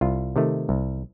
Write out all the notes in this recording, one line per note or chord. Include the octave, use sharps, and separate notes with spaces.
C2 F4
C3 D#3 A3
C2